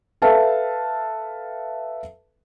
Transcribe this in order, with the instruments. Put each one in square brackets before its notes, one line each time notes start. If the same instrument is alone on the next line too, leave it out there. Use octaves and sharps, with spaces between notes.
[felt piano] A4 B4 E5 F5 A5